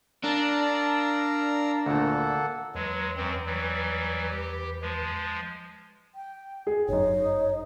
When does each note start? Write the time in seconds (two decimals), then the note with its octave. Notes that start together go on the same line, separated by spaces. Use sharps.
0.24 D4 A#4 D5 F5 A5 A#5 E6
1.86 D2 A#2 A#3 A4 F#5
2.75 E2 F#3 G#3 B4
3.17 F#2 F#3 C4
3.46 E3 F#3 G3
4.30 G4
4.82 F3 G#3
6.15 G5
6.67 G#4
6.88 G1 F#2 D#4 C#5